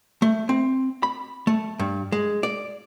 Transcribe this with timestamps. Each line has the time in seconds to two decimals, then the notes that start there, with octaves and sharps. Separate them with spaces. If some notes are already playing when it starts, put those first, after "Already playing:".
0.22 A3
0.49 C4
1.03 B5
1.47 A3
1.79 G2
2.12 G#3
2.43 D5